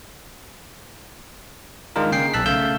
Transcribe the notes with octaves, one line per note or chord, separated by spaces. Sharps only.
D#3 G#3 D4 F4 A#4
C#3 A#3 G#4 G5 C7
B1 A5 E6 F#6 B6
C#3 A3 F5 E6 G6